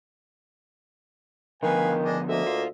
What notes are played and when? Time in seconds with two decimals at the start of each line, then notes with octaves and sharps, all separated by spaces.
1.63 D3 D#3 F3 B3 B4 F5 G#5
2.04 D4 G#4 D#5
2.28 D2 A#3 D#5 E5
2.47 F4